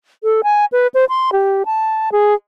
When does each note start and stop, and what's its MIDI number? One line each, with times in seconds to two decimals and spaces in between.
0.23 0.41 69
0.44 0.65 80
0.72 0.87 71
0.94 1.05 72
1.09 1.30 84
1.32 1.63 67
1.66 2.09 81
2.12 2.34 68